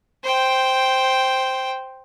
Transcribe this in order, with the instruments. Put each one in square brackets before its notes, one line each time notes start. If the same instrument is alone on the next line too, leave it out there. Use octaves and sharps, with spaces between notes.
[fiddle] C5 G5